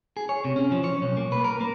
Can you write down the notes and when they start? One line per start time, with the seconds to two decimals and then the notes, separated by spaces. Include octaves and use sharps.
0.17 G#4
0.29 C#5
0.45 C3
0.56 C#4
0.72 F3
0.84 C#5
1.02 B1
1.17 A#3
1.32 B4
1.44 A#4
1.61 A#3